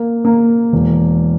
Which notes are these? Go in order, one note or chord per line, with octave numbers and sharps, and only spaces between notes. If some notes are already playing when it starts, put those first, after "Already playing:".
Already playing: A#3
A#3
E1